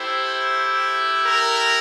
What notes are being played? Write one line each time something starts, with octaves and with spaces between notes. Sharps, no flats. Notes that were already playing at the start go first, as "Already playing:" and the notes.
Already playing: A3 E4 G4 C5
A#4